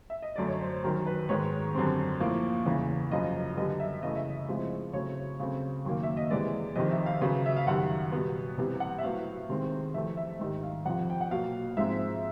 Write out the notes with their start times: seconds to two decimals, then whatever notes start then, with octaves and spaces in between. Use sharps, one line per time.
0.10 E5
0.22 D#5
0.36 F#2 D3 F#3 A3 D5
0.48 C#5
0.61 C5
0.84 F#2 D#3 F#3 A#4
1.06 B4
1.29 G#2 D#3 G#3 B3 C#5
1.75 F#2 D3 G3 C4
2.20 A2 F3 A#3
2.66 E2 C#3 E3
3.11 F#2 C#3 F3 D#5
3.57 F#2 D3 G3 B3 D#5
3.80 E5
4.03 C#3 E3 A3 D#5
4.16 E5
4.29 D#5
4.48 A2 F3 G#3 C4
4.93 C#3 F#3 A3 C4 C#5
5.40 C#3 F#3 A3 C4
5.85 F#2 D#3 F#3 A#3
6.03 E5
6.17 D#5
6.30 C3 E3 G#3 B3 D5
6.75 F2 C3 D#3 D#5
6.91 E5
7.06 F5
7.21 C#3 F#3 B3
7.46 E5
7.57 F5
7.67 F#2 D#3 G3 F#5
8.12 B2 G3 B3
8.58 C3 E3 G3 B3
8.80 F#5
8.98 E5
9.03 A2 F#3 B3 F5
9.49 C3 D#3 G#3 C4
9.94 F2 C3 E3 A3 E5
10.17 E5
10.39 G#2 D#3 G3 D#5
10.63 F5
10.85 F2 C3 F3 F#5
11.10 G5
11.21 F#5
11.31 B2 F#3 A#3 F5
11.77 G#2 F3 G#3 C4 E5